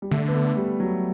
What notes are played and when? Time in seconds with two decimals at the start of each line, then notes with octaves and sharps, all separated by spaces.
0.02 G3
0.11 D3 A3
0.28 B3
0.34 A3
0.57 G3
0.80 F#3